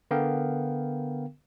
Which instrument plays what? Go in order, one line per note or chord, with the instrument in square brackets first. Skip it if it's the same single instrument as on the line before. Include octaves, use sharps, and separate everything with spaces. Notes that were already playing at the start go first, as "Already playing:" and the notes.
[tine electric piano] D3 B3 A#4 F5 G5